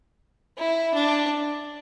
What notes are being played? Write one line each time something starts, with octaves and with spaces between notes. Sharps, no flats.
E4
D4